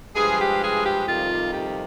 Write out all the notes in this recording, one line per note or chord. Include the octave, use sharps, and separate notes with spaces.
G2 F3 G#3 G#4
G4
G#4
G4
F2 C3 D#3 G3 F4
G4